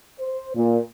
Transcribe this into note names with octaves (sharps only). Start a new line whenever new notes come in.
C5
A#2